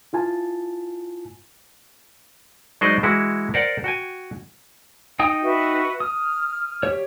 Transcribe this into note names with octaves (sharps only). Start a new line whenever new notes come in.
E4 F4 G#5 A5
F#3 G#3 D#4 C5 D5 D#5
E3 G#3 E4 F#4
A#4 C5 D5 F#5
F#4 G5 G#5
D#4 G5 D#6
F#4 B4 E5
D#6 F6
G4 C#5